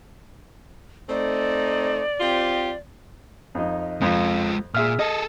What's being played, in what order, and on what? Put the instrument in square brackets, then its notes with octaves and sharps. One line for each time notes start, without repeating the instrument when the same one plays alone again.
[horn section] A3 C4 D#4 [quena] D5
[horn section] C4 F4 G4
[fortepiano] F2 D#4
[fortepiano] F2 [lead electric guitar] G#3 F4
[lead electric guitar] A#2 [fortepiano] G#4 E5 F6
[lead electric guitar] G#4 A4 [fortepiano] D#5